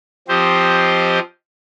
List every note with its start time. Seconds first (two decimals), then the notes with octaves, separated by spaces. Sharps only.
0.28 F3 C4 G4 C5 D#5